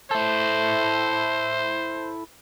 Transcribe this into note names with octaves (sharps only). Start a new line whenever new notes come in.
E4 A4 C5